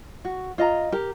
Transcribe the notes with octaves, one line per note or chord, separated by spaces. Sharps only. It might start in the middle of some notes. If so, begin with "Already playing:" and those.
F#4
F4 D#5 A#5
G4 A#4